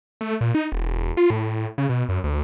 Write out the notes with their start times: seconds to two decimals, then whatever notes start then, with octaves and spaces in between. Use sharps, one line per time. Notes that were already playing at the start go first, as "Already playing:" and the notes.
0.21 A3
0.41 A#2
0.55 D#4
0.72 E1
1.17 F4
1.30 A2
1.78 C#3
1.89 B2
2.09 F#2
2.24 D2